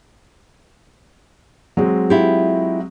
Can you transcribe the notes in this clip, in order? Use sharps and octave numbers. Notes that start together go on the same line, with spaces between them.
F#3 G#3 C4
E4 F4 G4